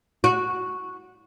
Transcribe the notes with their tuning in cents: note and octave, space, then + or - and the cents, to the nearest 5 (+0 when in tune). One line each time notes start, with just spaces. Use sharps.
F#4 -5